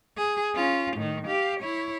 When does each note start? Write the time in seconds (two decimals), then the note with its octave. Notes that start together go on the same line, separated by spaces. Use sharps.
0.17 G#4
0.55 C#4 F4
0.97 A2 D#3
1.26 G4 F5
1.60 E4 C#5